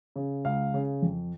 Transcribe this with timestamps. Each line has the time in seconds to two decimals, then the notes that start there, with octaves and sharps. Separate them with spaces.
0.16 C#3
0.45 C#2 F5
0.74 C#3
1.02 F2